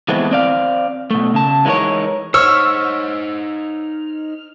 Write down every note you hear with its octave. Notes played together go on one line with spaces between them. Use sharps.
E3 G#3 A3 B3 C4
C4 D5 F5
B2 A3
C#3 A5
E3 G#3 D#4 F4 A#4 C#5
D#4 C5 C#5 E6 F6